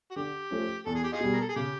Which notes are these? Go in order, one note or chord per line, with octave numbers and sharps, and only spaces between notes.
F#4
D3 G4
F3 A3 C#4
E2 A4
G#4
G4
D#4 F4 G#4
B2 G3
A#4
A4
G#4
C#3 G4